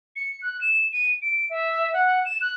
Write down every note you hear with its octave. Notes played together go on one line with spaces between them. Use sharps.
C#7
F#6
E7
D#7
D7
E5
F#5
E7
F#6